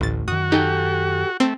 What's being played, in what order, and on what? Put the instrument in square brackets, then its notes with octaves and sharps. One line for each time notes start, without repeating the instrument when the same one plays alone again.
[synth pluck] A1 A6 [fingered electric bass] D2 A2
[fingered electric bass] F#2 D#3 [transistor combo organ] F#4 [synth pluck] D#6
[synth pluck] D#4 [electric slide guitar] G4 A4 G5
[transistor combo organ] A3 [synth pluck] C4